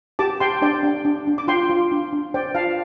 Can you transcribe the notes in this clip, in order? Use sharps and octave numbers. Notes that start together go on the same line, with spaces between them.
G4 A5 D6
G4 G5 C6
D4 D5 G5
D4
D4
D4
D6
F4 G5 C6
F4
D4
D4
C5 D5 G5
F4 F5 A5